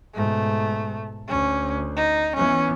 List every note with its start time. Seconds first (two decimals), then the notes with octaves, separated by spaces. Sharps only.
0.15 G#2 B2 A3
1.29 D2 C#4
1.97 D#4
2.36 E3 B3 C#4